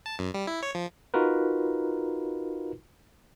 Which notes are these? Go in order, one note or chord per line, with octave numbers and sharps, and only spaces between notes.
A5
F#2
G3
E4
C#5
F3
D#4 F4 F#4 A#4 B4